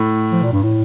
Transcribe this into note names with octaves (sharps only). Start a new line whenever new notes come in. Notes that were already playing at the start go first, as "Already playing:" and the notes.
Already playing: A2
F3
A#2
G2
A2